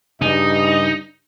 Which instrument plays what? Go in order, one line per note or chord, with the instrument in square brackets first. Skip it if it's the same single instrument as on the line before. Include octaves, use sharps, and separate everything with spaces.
[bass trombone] G2 [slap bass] C#3 G3 [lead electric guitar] D#4 [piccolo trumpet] D#5